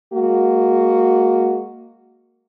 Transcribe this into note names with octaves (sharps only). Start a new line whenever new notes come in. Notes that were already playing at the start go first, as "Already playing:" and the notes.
G#3 A#3 F#4